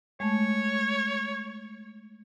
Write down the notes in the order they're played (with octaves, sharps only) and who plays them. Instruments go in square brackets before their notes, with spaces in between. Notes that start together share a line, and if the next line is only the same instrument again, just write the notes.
[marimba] G#3 A3 [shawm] C#5